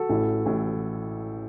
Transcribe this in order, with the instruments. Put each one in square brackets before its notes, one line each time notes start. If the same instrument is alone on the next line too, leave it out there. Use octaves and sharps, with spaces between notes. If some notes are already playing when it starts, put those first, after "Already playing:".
Already playing: [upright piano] F#4 A4
A1 A2 E3
A1 A2 E3